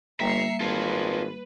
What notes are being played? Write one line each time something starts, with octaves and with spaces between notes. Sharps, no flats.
G1 G3 A#3 E5 A#5 C7 C#7
G#1 F4 A4 B4